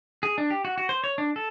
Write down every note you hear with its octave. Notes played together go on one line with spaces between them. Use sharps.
G#4
D4
G4
F#4
F#4
C5
C#5
D4
A4